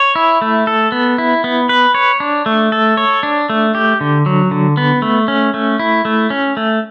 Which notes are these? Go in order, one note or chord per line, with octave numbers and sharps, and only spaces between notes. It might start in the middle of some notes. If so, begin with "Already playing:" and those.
Already playing: C#5
E4
A3
A4
B3
E4
B3
B4
C#5
D4
A3
A4
C#5
D4
A3
G4
D3
F#3
D3
B3
A3
C#4
A3
E4
A3
C#4
A3